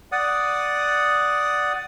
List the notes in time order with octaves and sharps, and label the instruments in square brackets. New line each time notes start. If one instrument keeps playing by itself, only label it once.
[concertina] D5 F#5 D#6